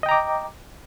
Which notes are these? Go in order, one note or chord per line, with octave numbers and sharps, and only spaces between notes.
D#5 G5 A#5 D6